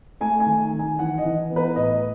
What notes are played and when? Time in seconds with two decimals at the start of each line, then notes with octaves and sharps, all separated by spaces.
0.21 A3 G#5
0.40 G#5
0.46 D#3
0.73 D#3
0.79 G#5
0.99 E3 F#5
1.18 D#5
1.25 E3
1.50 B3
1.56 B4
1.76 A2 D#5